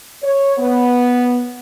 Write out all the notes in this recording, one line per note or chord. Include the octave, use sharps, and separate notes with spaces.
C#5
B3